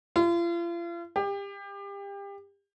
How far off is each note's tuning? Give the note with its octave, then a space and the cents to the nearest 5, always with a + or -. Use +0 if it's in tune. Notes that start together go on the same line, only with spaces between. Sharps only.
F4 -40
G4 +30